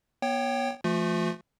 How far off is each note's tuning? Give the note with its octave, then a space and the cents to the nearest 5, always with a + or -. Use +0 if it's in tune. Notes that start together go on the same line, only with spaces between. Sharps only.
B3 -35 C#5 +0 G5 +0
F3 -40 A3 +0 F4 +45